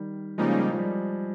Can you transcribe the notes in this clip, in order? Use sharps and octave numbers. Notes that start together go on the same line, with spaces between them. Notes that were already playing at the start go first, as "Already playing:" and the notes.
Already playing: D#3 G3
C#3 F3 G3 G#3 A#3 D#4
F3
G3